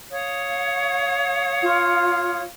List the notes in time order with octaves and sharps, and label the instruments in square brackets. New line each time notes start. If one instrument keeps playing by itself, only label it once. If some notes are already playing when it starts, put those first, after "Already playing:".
[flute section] C#5 F5 D#6
[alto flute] F4